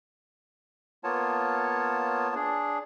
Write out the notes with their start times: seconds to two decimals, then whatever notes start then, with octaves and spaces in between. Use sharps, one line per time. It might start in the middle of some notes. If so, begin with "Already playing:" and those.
1.04 A#3 B3 F4 C#5 A5
2.35 D4 G#4